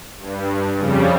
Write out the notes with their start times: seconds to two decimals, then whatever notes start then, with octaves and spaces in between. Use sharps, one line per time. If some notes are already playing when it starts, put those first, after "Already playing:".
0.19 G2
0.78 F2 C#3 G3